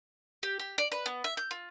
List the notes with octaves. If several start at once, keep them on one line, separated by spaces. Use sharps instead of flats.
G4
G4
D5
B4
B3
E5
G6
F4